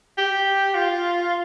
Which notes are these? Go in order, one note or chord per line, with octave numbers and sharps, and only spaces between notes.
G4
F4